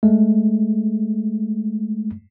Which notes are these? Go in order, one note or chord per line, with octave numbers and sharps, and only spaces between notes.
G#3 A3